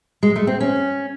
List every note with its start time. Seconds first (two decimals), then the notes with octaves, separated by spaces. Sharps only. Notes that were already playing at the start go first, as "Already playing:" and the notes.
0.23 G#3
0.36 A3
0.47 C4
0.60 C#4